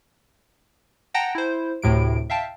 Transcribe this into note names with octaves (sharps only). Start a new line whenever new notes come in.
F#5 G5 A5 A#5 A#6
E4 C5
D2 A2 C3 D7
E5 F5 G5 A5